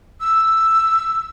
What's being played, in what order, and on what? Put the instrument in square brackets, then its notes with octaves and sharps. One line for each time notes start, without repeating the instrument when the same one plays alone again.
[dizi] E6